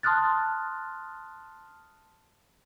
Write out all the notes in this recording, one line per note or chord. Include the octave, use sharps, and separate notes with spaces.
A5 C6 D#6 F6 F#6 A6